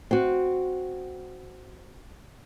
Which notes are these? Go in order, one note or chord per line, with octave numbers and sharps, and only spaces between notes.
C4 F#4